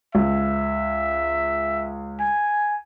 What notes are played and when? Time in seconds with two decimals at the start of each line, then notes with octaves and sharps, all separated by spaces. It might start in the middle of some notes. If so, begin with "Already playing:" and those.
0.15 C#2 E5
2.20 G#5